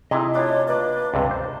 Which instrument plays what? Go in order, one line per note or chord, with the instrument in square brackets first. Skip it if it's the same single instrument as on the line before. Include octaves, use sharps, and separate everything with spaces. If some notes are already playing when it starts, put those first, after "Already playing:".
[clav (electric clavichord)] C3 G#5 [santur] D#4 E4 G#4 [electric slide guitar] D#5
[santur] A3 D4 F4 [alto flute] C#5
[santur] A#3 D5 [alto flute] B4
[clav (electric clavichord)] C#2 G2 C3
C5